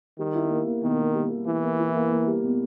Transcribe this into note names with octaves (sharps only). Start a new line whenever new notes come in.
D#3 G3
E4
A#3
A#3
B2 D#3
A#3
G3
G3
E3 E4
A#3
E4
A#3
A#3
G3
B2